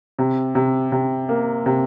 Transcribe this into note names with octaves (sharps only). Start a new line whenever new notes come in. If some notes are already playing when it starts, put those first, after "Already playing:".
C3
C3
C3
A#3
C3